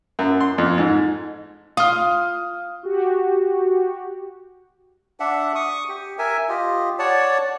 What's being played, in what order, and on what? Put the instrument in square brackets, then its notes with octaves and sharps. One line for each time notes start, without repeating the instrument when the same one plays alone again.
[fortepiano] F#2
C6
F2
G#2
[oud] F4 [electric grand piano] D#6 F6
[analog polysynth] F#4 G4
[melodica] D4 E5 F#5
C#6 D#6
G4
A#4 E5 G#5
F4 G4 D#5
C#5 D5 F#5 A5